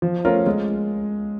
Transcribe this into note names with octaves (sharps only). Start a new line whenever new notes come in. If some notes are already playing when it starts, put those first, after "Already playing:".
F3
A3 C#4 F4 A#4
G#3